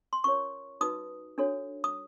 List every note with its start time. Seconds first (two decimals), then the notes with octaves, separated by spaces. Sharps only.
0.13 C6
0.24 C#4 F4 A#4 C#5 C#6
0.81 D#4 F#4 B4 D#6
1.38 D4 F#4 A4 C#5
1.84 D#6